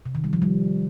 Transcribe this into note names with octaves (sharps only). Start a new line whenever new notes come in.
C3
D#3
G3
F3
G3